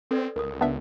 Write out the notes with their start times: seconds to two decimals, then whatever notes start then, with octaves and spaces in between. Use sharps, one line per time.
0.11 C4 A4 B4 D5
0.36 C#2 A#4 D#6
0.61 B3 D4 E5